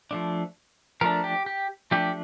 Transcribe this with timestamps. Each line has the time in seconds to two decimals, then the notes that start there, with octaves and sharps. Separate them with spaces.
0.11 F3 A3 D4
1.01 F3 A3 D4 A#4
1.24 G4
1.46 G4
1.91 F3 A3 D4 G4